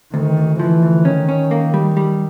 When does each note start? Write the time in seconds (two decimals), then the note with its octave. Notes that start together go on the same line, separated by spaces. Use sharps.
0.14 D2 D#3
0.37 D2
0.60 E3 F3
0.82 D2
1.05 D#3 C#4
1.29 C#4
1.51 A#3
1.74 G3
1.97 G3